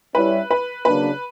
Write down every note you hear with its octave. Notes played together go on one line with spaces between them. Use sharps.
G3 C#4 E4 B4
B4
C#3 F#3 A#3 D4 B4